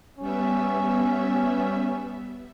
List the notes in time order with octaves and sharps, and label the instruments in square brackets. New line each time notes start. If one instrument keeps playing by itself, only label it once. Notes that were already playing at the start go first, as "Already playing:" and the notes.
[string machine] G3 B3 E5 [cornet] C#4